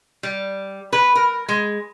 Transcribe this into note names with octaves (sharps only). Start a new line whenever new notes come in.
G3
B4
A#4
G#3